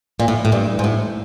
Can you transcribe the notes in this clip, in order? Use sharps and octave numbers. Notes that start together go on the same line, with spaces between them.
A#2
A2
A2
G2
G#2
A2